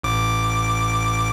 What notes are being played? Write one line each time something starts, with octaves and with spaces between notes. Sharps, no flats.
A1 D6